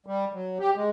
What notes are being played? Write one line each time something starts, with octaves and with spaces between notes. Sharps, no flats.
G3
F#3
G4
G#3